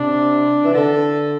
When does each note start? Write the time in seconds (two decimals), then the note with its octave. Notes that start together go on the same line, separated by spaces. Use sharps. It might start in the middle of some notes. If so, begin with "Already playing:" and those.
Already playing: C3 D4
0.64 E3
0.74 D3 A4